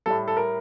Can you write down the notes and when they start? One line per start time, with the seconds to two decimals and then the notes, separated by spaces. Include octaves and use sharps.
0.06 A2 G3 A4
0.28 A4
0.37 A#4